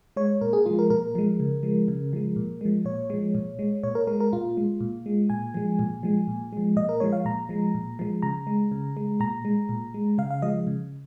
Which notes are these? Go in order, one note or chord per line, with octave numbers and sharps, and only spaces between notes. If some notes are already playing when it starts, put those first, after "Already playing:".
G#3 C#5
A#2 A#4
G#4
F3 G#3 F4
A#4
A#2 A#4
F3 G#3
C#3
F3 G#3
C#3
F3 G#3
A#2
F3 G#3
A#2 C#5
F3 G#3
A#2
G#3
A#2 C#5
A#4
G#3 A#4
A#4
A#2 F4
G#3
A#2
G#3
A#2 G#5
F3 G#3
A#2
F3 G#3
A#2
F3 G#3
A#2 D#5
A#4
F3 G#3 C#5
F5
A#2 A#5
F3 G#3
A#2
F3 G#3
C#3 A#5
G#3
C#3
G#3
A#2 A#5
G#3
A#2
G#3
C#3 F5
F5
F3 G#3 D#5
C#3